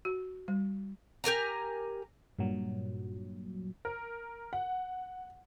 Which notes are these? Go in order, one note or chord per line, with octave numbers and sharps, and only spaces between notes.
F#4
G3
G4 A#4 G#5 A#5
G2 A#2 F#3
A#4
F#5